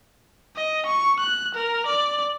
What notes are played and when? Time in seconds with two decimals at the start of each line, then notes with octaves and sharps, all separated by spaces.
0.56 D#5
0.86 C#6
1.20 F#6
1.55 A#4
1.87 D5